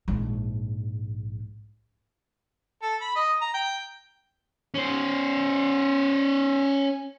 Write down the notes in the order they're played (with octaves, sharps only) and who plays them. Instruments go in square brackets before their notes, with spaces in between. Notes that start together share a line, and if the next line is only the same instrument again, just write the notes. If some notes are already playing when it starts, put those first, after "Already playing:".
[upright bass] A#1 G#2
[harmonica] A4
B5
D#5
A#5
G5
[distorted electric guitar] C#4 C5